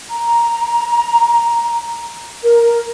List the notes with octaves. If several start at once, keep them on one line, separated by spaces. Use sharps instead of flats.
A#5
A#4